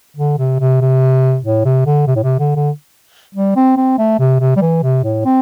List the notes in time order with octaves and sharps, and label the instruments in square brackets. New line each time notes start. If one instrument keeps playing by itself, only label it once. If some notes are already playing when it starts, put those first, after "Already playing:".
[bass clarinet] D3
C3
C3
C3
A2
C3
D3
C3
A2
C3
D3
D3
G3
C4
C4
A3
C3
C3
G3
E3
C3
A2
C4